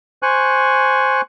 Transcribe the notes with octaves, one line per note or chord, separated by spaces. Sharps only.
C5 G#5 C#6 F#6